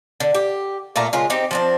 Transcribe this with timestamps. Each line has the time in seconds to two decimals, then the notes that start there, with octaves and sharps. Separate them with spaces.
0.20 D3
0.35 G4
0.96 A#2 A3 F5 A#5
1.13 C#3 G#3 F4 A#4
1.30 C4 D#4 G4
1.51 F3 C4 D4